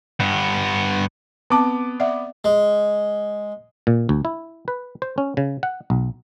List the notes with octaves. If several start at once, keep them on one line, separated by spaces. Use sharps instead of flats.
G2 B3
B3 C4 A5 D6
D5 E5 F#5
G#3
A#2
D2
E4
B4
C5
C#4
C#3
F#5
B1